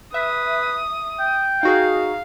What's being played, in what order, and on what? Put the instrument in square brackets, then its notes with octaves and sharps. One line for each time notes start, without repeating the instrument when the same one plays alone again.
[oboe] B4 [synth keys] E5 [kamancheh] D#6
[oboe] G5
[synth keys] D#4 F#4 G#4 [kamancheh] F5